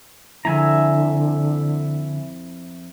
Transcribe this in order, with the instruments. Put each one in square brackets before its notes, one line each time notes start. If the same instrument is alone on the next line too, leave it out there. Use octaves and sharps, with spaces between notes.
[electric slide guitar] F2 E4 [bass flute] D3 [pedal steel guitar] E5 G#5 A#5